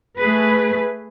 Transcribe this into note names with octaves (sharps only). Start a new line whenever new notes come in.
A3 G#4 B4